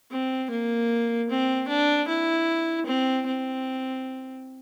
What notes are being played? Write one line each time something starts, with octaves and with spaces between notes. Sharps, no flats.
C4
A#3
C4
D4
E4
C4
C4